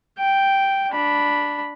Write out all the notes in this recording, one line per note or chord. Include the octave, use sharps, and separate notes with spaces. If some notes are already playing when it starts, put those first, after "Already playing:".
G5
D4 B5